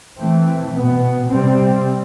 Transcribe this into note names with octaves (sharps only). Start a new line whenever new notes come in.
E3 A3 C4
B2 B3
C3 G3 C4